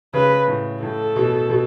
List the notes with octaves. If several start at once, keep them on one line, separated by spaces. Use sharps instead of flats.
C#3 B4
A2
A2 A4
B2
B2